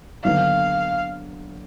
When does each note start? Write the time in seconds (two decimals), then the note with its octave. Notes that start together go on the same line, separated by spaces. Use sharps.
0.24 D#2 D3 F#3 B3 D4 F5